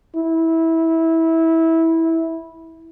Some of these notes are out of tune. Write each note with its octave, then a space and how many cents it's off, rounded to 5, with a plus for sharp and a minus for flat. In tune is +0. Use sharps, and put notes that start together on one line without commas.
E4 -15